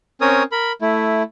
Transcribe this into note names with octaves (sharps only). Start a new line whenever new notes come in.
C4 C#4 A#4 C#5 D#6
A#4 B5
A3 E4